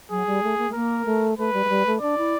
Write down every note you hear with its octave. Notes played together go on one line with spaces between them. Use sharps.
F#3 G#4
G3
A3
A#3
A3
A#3 A#4
A3
A3 B4
G3
G#3
G3
A3
D4 D5
E4